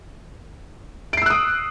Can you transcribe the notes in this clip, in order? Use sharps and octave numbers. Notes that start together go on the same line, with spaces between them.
D#6 E6 F#6 C7 D7